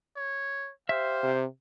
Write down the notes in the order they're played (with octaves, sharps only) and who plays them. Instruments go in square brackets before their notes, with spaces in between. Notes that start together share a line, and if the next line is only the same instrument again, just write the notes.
[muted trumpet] C#5
[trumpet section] G4 C5 [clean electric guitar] E5 [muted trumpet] F5
[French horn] C3